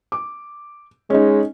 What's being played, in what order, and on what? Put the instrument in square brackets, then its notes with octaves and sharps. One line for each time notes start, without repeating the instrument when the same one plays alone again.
[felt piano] D6
[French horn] G#3 [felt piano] C#4 D#4